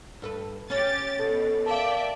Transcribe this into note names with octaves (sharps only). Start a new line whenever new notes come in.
G2 A4 B4
C#4 G4 C#5 A6
B2 A4
A#4 D5 E5 F5 G5 A5